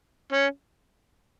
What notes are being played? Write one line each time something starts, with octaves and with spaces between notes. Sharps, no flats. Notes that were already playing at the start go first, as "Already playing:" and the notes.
C#4